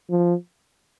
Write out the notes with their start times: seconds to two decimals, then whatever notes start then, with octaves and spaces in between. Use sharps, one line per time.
0.10 F3